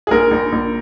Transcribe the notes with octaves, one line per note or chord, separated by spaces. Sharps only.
G#4
A#1 A#4
A#1
A#1